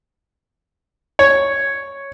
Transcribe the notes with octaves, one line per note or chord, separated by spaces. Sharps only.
C#5